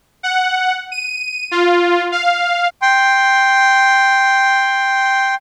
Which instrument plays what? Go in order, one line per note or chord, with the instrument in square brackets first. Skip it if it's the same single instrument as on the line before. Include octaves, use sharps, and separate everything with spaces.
[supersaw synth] F#5
D#7
F4
F5
[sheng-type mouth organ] G5 C6